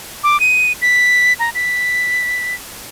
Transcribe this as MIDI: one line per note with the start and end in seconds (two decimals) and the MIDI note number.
0.24 0.39 86
0.40 0.72 99
0.82 1.33 95
1.40 1.50 82
1.55 2.55 95